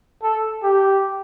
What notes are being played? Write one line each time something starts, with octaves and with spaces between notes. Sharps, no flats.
A4
G4